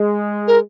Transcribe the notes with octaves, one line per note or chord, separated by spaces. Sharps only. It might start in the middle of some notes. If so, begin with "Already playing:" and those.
Already playing: G#3
A#4